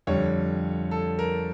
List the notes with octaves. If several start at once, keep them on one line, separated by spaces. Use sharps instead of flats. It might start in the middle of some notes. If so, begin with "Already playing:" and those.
F2 D3 G3 C#5
A4
A#4